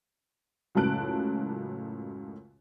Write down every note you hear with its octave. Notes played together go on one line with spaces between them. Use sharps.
C#2 F#2 A2 A5 F#6 D7